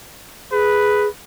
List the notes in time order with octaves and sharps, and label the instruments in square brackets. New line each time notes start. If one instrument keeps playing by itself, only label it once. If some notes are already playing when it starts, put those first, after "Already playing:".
[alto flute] G#4 [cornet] B4